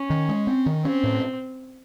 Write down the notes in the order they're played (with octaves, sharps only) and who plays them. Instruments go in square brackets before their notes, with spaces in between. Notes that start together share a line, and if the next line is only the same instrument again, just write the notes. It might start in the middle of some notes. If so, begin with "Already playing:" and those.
Already playing: [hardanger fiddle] C#4
[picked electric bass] D#3
G#3
C4
D#3
[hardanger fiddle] C4 [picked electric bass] C#4
[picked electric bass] A2